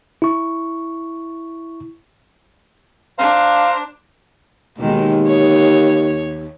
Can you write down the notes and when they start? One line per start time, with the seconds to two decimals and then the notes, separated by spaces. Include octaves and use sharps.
0.22 E4 C#6
3.18 D4 C5 F5 A#5
4.78 D#2 B2 D#3 G#3
5.27 C#5